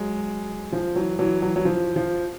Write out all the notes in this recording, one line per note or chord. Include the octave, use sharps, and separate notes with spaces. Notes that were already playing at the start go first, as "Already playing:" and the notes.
Already playing: F#3 G#3
F3
E3 F#3
E3 F#3
E3 F#3
F#3
F3
F3